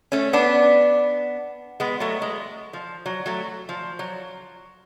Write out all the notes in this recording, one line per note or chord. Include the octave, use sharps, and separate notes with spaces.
A3 C#4
B3 D4
G#3 B3
F#3 A3
G#3
F3
F#3
F#3 A3
F3
F#3